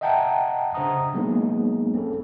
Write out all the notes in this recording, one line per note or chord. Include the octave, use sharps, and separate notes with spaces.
D#5 E5 F#5 G5 A5 A#5
C#3 D4 C5 F#5 A#5 D#6
F#3 G#3 A#3 B3 D#4 G#4
C4 C#4 A4